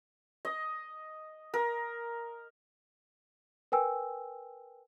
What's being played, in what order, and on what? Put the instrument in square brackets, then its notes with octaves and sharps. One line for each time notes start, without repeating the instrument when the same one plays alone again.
[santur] D#5
A#4
[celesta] A#4 B4 G5 G#5 E6